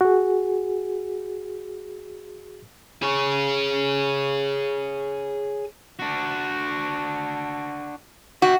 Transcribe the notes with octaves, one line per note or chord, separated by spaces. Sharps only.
F#4 G#4
G#4 C#5
D4 F#4
F#4 E5 G5